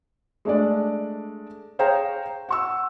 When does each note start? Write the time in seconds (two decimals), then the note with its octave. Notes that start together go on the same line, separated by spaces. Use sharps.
0.45 G#3 A3 D4 D5
1.79 G#4 C5 C#5 F5 G5 A#5
2.49 F#5 C#6 E6